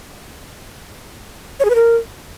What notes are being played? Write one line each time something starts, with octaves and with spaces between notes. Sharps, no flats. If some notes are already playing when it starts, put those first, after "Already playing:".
C#5
G#4
B4
A#4